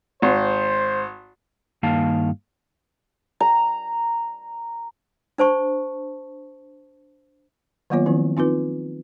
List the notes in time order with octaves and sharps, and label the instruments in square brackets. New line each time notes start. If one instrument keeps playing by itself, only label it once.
[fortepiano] G#1 [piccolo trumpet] C5
[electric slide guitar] G2 D#3 A#3 F5 A5
[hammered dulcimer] A#5
[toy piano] D4 C5 A5 C#6
[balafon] D#3 F#3 A#3 B3 F4 C#5
D#3 F3 C4 E4
C4 D#4 F4 B4